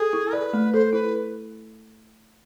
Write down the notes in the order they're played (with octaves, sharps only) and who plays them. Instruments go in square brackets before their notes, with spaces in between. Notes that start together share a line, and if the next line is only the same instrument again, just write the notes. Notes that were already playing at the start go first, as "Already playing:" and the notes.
Already playing: [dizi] G#4 [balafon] A4
[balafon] E4
[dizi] B4 [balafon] D5
[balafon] A3
[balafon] A4 [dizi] C5
[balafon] E4 [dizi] B4